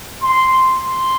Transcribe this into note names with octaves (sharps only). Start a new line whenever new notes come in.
C6
C6